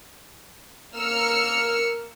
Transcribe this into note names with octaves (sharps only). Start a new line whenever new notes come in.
A#3 E6 F6 C#7